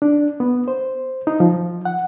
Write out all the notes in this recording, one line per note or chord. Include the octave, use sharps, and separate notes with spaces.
D4
B3
C5
D#4
F3
F#5